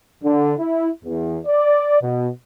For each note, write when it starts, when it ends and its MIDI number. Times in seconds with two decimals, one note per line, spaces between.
0.23 0.53 50
0.59 0.87 64
1.03 1.37 40
1.46 2.00 74
2.01 2.28 47